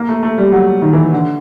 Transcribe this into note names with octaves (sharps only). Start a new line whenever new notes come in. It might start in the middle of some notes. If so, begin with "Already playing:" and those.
Already playing: A#3
A3
A3
G3
F#3
D#3
E3
D3